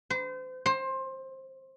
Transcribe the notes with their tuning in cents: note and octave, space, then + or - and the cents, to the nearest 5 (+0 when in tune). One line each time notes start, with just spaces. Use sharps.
C5 -35
C5 +20